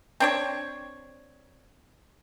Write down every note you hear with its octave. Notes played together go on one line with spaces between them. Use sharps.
C4 D4 C#5